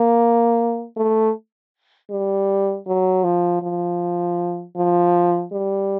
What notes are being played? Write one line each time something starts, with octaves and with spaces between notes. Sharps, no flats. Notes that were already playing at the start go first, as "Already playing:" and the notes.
Already playing: A#3
A3
G3
F#3
F3
F3
F3
G3